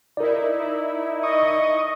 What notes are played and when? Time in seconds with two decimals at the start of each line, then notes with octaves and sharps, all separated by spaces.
0.17 D#4 E4 A#4 D5
1.23 D#5 C#6 D#6